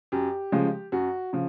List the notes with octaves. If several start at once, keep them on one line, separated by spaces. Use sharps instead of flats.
F#2 G4
C#3 F3 G#3
F#2 F#4
C#3 F3